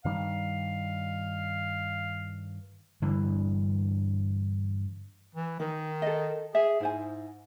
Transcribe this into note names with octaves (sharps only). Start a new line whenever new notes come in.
G2 D#3 G3 F5
G2 D3 E3
E3
D#3 D#4
A4 D#5
G#4 E5
G#2 E4 C5 G#5